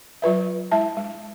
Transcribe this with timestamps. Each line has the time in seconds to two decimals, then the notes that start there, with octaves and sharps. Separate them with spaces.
0.22 F#3 F4 B4 E5
0.71 G#3 E4 E5 A5
0.97 G#3